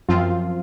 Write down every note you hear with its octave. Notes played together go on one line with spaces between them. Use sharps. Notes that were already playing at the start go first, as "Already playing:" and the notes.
F#2 F3 C4 F4